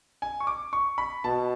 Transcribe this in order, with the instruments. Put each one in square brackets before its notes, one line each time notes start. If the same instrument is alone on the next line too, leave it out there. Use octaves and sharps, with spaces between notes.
[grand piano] G#5
C#6
D6
C#6
B5
[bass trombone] B2 [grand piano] A5